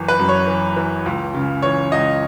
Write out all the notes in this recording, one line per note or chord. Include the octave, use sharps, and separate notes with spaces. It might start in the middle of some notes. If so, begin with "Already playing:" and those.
Already playing: F#1 E3
B4
F#2
C#5
E3
E3
C#2
C#3
E3 C#5
C#2 D#5